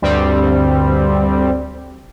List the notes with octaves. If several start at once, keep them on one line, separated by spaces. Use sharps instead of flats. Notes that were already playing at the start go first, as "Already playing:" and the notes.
D2 G2 G3 C4